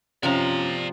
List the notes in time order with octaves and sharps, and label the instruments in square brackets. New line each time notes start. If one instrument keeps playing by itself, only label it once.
[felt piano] F#2 C#4 F4 [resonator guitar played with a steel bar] C3 F3 [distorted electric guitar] D5 A#5